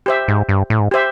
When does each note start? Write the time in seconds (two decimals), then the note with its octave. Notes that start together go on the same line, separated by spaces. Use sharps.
0.06 G4 C5 E5
0.28 G#2
0.49 G2
0.70 A2
0.80 G#2
0.91 G4 C5 E5